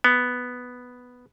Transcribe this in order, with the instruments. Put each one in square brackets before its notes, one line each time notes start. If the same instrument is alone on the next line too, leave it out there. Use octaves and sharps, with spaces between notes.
[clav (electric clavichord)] B3